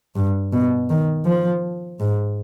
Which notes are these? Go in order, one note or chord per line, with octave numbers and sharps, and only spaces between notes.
G2
B2
D#3
F3
G#2